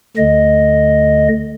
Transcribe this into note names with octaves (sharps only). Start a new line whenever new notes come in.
D2 D3 D#5